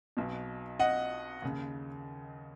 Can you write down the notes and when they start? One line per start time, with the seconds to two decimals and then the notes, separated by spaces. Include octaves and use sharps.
0.17 B1 B2
0.80 D#5 F#5
1.42 D#2 C#3